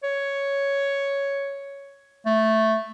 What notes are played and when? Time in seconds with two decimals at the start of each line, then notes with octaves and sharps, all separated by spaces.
0.04 C#5
2.26 A3